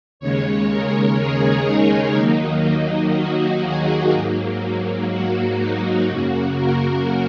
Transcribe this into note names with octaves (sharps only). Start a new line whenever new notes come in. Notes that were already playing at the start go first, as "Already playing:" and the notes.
D#2 C#3 G#3 C#5
A#4
G#4
D#4
D#2 D#3 F#3 A#3 D#4
D#4
F#4
G#4
G#2 F#3 A#3
F#4
D#4
F#2 C#3 A#3 F#4
A#4